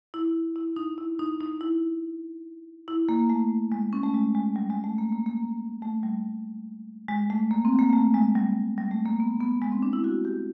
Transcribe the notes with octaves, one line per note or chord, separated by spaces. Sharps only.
E4
E4
D#4
E4
D#4
D#4
E4
E4
A#3
A3
G#3
C#4
A3
G#3
G#3
G3
G#3
A3
A#3
A#3
A#3
A3
G3
G#3
A3
A#3
C4
A#3
A3
G#3
G3
G3
A3
A#3
B3
B3
G#3
C4
D4
E4
F#4
G4